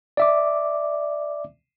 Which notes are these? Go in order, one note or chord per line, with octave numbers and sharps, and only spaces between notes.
D5 E5 D6